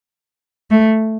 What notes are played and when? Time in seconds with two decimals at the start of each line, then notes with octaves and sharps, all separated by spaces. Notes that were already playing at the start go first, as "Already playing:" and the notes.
0.71 A3